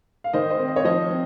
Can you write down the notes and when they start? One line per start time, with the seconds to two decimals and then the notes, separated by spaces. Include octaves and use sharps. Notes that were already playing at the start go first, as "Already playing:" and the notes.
0.24 F5
0.33 D#3 C5 D#5
0.50 C5 D#5
0.60 C4
0.68 D#5
0.76 C#5
0.84 F3 C5 D#5
1.10 C4